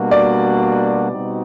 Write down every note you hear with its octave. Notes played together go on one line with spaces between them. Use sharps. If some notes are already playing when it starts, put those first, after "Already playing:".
Already playing: B2 G3 A#3 D4 F#4
D5
B2 G3 C4 D#4 F#4